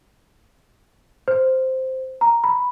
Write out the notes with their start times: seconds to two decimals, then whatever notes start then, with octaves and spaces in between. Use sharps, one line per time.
1.28 C5
2.21 A#5
2.44 B5